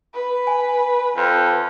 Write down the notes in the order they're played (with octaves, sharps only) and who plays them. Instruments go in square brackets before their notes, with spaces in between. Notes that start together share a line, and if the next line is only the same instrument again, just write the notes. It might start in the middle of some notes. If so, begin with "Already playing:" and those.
[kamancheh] B4
[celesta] G#5
[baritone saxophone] F2